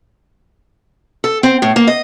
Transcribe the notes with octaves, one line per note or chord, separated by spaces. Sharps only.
A4
C4
A2
A#3
D#5